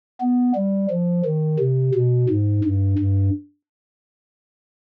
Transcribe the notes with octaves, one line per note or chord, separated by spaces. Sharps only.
B3
G3
F3
D#3
C3
B2
G#2
G2
G2